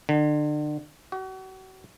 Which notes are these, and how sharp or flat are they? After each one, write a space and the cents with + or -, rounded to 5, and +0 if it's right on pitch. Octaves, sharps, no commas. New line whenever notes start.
D3 +35
F#4 +35